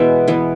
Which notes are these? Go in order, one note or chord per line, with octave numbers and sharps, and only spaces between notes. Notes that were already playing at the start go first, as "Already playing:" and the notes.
Already playing: B2 E3 G#3 B3 E5
E3 B3